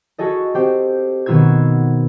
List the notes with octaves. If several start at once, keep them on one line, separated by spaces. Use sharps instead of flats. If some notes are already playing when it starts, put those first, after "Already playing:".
F#4 G#4 A4 D#5
C4 G4 C5
B2 D#3 B3 F4 E6 G#6